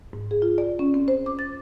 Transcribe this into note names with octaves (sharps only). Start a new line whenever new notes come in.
G#2
G#4
F4
D5
C#4
C4
C5
D6
A6